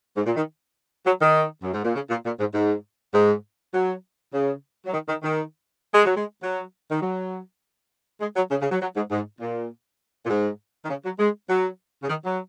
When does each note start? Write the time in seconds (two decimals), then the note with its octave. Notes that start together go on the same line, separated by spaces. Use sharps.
0.16 G#2
0.26 A#2
0.36 D#3
1.06 F#3
1.21 D#3
1.63 F#2
1.73 G#2
1.84 A#2
1.95 C#3
2.10 A#2
2.25 A#2
2.40 G#2
2.54 G#2
3.14 G#2
3.74 F#3
4.33 C#3
4.86 F#3
4.93 D#3
5.08 D#3
5.23 D#3
5.94 G#3
6.05 F#3
6.16 G#3
6.42 F#3
6.91 D#3
7.02 F#3
8.21 G#3
8.36 F#3
8.50 C#3
8.61 C#3
8.71 F#3
8.81 F#3
8.96 G#2
9.11 G#2
9.41 A#2
10.26 A#2
10.30 G#2
10.85 D#3
10.90 C#3
11.05 F#3
11.19 G#3
11.49 F#3
12.03 C#3
12.09 D#3
12.24 F#3